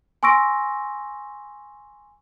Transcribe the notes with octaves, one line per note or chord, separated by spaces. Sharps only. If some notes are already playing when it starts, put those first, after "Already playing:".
G#5 C6 C#6 E6 A#6 D7